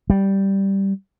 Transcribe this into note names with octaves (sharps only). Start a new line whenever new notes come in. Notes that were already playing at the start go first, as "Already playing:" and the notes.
G3